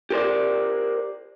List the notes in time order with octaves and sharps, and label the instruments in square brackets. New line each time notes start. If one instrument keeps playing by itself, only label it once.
[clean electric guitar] G4 A#4 C5 D5